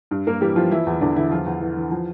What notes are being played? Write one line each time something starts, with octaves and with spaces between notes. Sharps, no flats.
G2
G2 A#3 A#4
E3 G3 G4
E3 F3 F4
E3 F3 E4
E2
E2 D3 D4
D3 E3 E4
E2 F3 F4
E2
E3
E3
F3